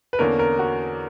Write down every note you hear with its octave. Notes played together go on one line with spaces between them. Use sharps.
B4
E2 D3 A#3 C#4 A#4
A#4
F#4